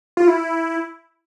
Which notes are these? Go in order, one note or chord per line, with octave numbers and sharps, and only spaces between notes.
F4
E4